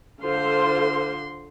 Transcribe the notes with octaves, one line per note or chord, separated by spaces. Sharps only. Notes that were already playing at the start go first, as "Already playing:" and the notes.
D3 F4 A4 C5 C6